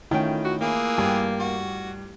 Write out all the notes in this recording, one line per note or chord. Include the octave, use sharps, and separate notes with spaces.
D#3 A3 C#4 E4 F4 G5
F#4
E3 A#3 G#4
G2 G4
F#4